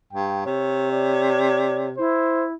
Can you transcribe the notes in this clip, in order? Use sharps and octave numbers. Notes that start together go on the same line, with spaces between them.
G2 G5
C3 C#5
C#5 D5
E4 C5